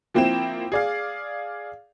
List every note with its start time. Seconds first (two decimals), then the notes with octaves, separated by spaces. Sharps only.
0.14 F3 A#3 C4 E4 G5 E7
0.72 G#4 D5 F5